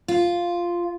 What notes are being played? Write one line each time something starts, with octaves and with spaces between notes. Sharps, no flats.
F4